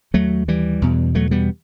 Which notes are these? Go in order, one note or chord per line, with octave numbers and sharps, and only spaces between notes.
D#2 F#3 A3
E3 G3
E2 B2
F#3 A3
G3 B3